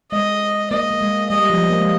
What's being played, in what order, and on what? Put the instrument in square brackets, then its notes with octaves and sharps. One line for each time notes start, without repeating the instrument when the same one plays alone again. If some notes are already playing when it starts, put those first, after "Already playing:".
[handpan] G#3 [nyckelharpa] D#5
[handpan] A#3 [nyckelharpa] D#5
[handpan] A#3
G#3
[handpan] G3 [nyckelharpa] D#5
[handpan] F3
A#3
G#3